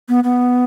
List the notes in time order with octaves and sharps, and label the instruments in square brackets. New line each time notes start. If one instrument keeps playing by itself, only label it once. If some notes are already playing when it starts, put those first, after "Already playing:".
[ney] B3
B3